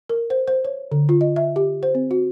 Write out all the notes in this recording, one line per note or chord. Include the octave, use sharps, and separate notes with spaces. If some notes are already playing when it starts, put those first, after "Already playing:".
A#4
C5
C5
C#5
D3
F4
D#5
E5
G4
C5
C4
F#4